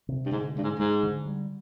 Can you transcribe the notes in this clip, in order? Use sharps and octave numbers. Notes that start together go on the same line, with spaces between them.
C3
G2
G#2 D3
G2 G#3
G#2
G#2 G#3
D3
G3